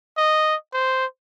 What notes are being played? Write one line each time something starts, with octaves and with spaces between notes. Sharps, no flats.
D#5
C5